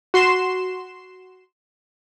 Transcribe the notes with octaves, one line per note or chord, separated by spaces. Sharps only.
F#4 C6 C7 E7